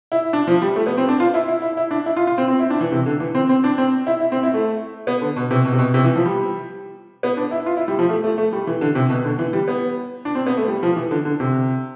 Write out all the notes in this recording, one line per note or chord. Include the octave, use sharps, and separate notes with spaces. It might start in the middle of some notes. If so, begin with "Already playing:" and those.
E4
D4
F3
G3
A3
B3
C4
D4
F4
E4
E4
E4
E4
D4
E4
F4
F4
C4
C4
E4
D4
E3
C3
D3
E3
C4
C4
D4
C4
E4
E4
C4
E4
A3
B3
D3
B2
C3
B2
C3
B2
C3
E3
F3
G3
B3
D4
E4
F4
E4
G3
F3
A3
A3
A3
G3
E3
D3
C3
B2
D3
E3
G3
B3
D4
C4
B3
A3
G3
F3
E3
D3
D3
C3